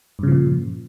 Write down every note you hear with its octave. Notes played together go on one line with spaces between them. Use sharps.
G2 A#2 C#3 F3